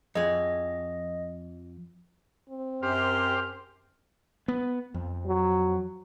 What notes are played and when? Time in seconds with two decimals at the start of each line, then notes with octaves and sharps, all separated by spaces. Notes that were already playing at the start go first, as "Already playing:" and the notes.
0.15 F2 G#4 D#5
2.49 C4
2.83 F#2 G4 C5 F6
4.48 B3
4.94 F2
5.26 F#3